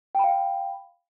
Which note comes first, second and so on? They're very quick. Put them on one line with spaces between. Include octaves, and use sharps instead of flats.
G5 B5 F5